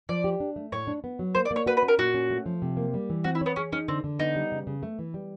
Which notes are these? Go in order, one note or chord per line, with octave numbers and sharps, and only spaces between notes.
F3 D5
G4
D4
A3
A2 C#5
D4
B3
F#3
A#3 C5
D5
A#3
C#5
F#4 B4
B4
C#4
A#4
A#2 F#4
C#4
A3
F3
C3
A#3
G3
E3
C4 F#4
E4
B3 C#5
C#4 G#4
C#4 D#4
D3 C4
D3
B3 D#4
G3
C#3
C#3
A3
E3
G3